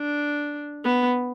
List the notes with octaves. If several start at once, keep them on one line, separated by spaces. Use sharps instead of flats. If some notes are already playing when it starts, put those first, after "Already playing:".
Already playing: D4
B3